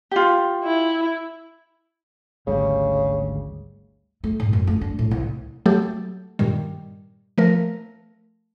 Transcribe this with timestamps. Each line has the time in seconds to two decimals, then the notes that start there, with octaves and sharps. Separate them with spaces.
0.11 F4 G4
0.64 E4
2.47 G#1 D2 C#3 G3
4.24 A3
4.40 G#2
4.53 F#2
4.67 A3
4.81 D4
4.99 A2
5.11 C2
5.66 F#3 A3 G4 A4
6.39 G2 A#2 D#3 G3
7.38 F3 A3 A#4